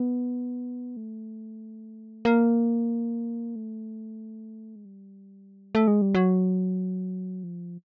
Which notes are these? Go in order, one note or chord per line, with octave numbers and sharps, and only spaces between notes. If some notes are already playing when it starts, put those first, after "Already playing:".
Already playing: B3
A3
A#3
A3
G#3
G3
A3
G#3
G3
F#3
F3